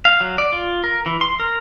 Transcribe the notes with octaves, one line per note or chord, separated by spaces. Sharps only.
F5
F#3
D5
F4
A#4
E3
C6
A#4